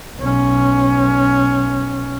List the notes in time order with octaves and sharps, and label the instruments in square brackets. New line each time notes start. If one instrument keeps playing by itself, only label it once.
[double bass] B1 C#4